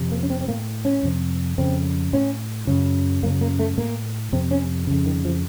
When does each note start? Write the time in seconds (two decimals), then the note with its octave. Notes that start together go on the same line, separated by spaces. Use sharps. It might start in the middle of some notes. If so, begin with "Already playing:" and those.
Already playing: F2 C3
0.12 A#3
0.23 C#4
0.30 C4
0.41 C4
0.48 A2 A#3
0.85 C#4
1.03 F2 C3
1.58 F2 C#3 C4
2.13 A2 C#4
2.67 F#2 C#3
3.23 F#2 A#3
3.26 C#3
3.41 A#3
3.59 A3
3.78 A2 A#3
4.32 F2 C3 C4
4.51 C#4
4.87 F2 C#3
5.06 D#3
5.25 F3